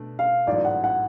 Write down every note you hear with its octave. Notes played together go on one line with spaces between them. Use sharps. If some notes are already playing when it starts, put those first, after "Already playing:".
Already playing: B2 A3 D4
F5
A1 G#2 F#3 A3 D5
F#5
F#5